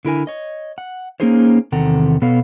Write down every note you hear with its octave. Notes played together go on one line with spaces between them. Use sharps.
D3 E4 A#4 G#5
C#5 D#5
F#5
A#3 C#4 D#4 G#4 C5 C#5
E2 C3 D#3 A4 F#5 A#5
B2 B3 A4 C#5 F5